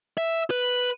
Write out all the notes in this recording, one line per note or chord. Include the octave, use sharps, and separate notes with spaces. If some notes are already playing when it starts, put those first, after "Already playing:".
E5
B4